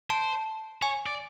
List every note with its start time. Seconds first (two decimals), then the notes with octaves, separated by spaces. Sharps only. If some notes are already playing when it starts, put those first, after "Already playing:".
0.10 C5 A5
0.82 C#5 G#5
1.06 D5